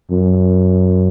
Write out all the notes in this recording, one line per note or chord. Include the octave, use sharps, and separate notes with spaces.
F#2